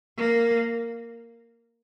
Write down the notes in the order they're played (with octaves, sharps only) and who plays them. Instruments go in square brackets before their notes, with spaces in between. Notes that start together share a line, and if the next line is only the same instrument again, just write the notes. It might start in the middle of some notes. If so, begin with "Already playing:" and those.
[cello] A#3